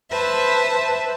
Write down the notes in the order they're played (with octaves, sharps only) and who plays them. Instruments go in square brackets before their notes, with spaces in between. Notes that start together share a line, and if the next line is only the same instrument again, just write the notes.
[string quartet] B4 C5 E5 A5